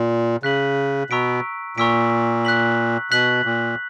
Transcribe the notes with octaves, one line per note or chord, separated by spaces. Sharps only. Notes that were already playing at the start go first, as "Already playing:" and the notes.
Already playing: A#2
C#3 F#6 B6 F#7
B2 A#5 C#6 E6 B6 D7
A#2 A#5 C#6 E6 B6 D7
F#6 B6 F#7
B2 F#6 B6 F#7
A#2